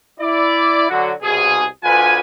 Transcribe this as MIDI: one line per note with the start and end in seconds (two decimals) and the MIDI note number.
0.20 0.89 64
0.20 0.89 74
0.90 1.10 50
0.90 1.10 54
0.90 1.10 66
1.22 1.65 36
1.22 1.65 47
1.22 1.65 68
1.84 2.20 38
1.84 2.20 65
1.84 2.20 71
1.84 2.20 80